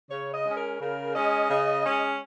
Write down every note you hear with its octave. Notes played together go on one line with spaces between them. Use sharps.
C#3 C#5
D#5
G#3 C#4
A#4
C#3 A#4
G#3 C#4 D#5
C#3
G#3 C#4